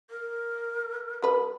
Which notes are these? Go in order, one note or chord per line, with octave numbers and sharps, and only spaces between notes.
A#4
G3 B4 B5